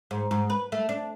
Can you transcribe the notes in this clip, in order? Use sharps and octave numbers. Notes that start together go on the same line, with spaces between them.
G#2
G#2
B4
A3
D4